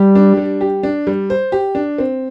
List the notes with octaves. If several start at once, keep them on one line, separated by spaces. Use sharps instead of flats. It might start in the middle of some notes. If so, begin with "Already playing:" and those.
Already playing: G3 G4
D4
G3
G4
D4
G3
C5
G4
D4
C4